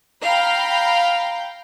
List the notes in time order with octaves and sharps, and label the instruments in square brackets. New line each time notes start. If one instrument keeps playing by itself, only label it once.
[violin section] F5 G5 A#5 B5